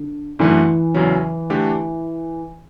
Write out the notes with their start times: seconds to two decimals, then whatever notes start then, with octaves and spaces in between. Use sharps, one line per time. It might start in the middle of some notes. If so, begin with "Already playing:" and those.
Already playing: D3
0.39 F#2 D3 E3 A3
0.95 E2 C#3 F#3 C#4
1.50 D3 A3 D4 G4